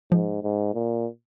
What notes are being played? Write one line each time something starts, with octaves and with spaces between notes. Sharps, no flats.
G#2 F3
G#2
A#2